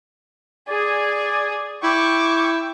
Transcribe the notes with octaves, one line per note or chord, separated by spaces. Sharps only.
G#4 D5 G#5
E4 G5 C#6 D6